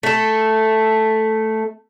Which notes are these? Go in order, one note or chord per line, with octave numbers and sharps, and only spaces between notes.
A3 A4